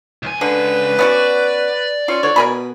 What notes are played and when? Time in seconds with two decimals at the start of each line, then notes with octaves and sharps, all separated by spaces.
0.23 C#2 G#5
0.41 D3 B4
0.99 B3 C#4 F#4 D5
2.08 C#4 F4
2.23 D3 C#5
2.36 B2 A#4 G#5 B5